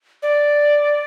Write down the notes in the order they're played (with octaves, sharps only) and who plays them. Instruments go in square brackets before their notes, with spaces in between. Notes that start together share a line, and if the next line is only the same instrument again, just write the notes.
[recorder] D5